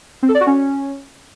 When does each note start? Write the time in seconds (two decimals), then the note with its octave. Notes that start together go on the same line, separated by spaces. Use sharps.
0.23 C4
0.29 A4
0.35 D5
0.41 F#4
0.47 C#4